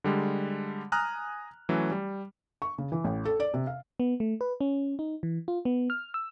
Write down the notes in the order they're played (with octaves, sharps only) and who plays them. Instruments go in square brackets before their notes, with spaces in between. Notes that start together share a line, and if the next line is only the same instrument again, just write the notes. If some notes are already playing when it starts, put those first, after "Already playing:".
[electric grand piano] D3 G3 G#3
G#5 A#5 D#6 F6 F#6
E3 F#3 A3 C#4
G3
[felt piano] C#6
C#3
E3
A1
A4
D5
C3
F5
[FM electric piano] B3
A3
B4
C#4
D#4
E3
F4
B3
F6
E6